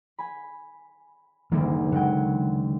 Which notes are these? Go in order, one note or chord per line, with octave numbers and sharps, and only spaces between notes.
G#5 B5
F#1 D2 D#3 E3 G3 A#3
C#3 F#3 G#3 F#5 G5